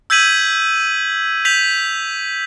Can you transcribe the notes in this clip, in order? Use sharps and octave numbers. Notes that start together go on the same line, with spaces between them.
E6 G6 G#6 B6 D#7 F#7
G6 B6 F7 F#7